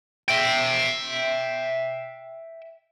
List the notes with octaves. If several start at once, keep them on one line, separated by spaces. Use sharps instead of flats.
E5 G5